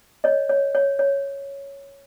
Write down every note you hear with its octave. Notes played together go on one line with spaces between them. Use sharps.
C#5 D#5
C#5
C#5
C#5